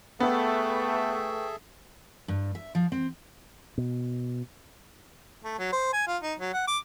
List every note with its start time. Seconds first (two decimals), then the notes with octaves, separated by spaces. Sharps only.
0.20 A3 B3 G#4 A4 B4 E5 G5 C#6
2.28 G2
2.55 E5
2.75 F3
2.92 C4
3.78 B2
5.44 A3
5.59 F#3
5.73 C5
5.93 G#5
6.07 F4
6.23 D#4
6.39 F#3
6.53 F#5
6.68 D6